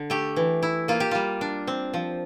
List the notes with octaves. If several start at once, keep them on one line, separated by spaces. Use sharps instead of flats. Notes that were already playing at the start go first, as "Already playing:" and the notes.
Already playing: D3
A3 G4
E3
E4
A#3 F4
G4
G3 F4
D4
C4
F3